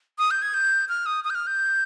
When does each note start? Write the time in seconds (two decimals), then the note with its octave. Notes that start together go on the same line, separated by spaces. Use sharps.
0.19 D#6
0.31 G6
0.42 G#6
0.54 G6
0.89 F6
1.06 D#6
1.24 D#6
1.30 G6
1.35 F6
1.47 G6